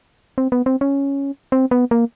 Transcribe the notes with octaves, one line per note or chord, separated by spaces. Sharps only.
C4
B3
C4
C#4
C4
B3
A#3